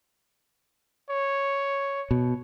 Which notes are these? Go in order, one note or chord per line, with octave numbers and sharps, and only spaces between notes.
C#5
B2